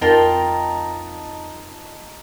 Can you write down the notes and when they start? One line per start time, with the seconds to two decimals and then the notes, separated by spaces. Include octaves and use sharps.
0.01 F2 D#4 F4 A#4 G5 A5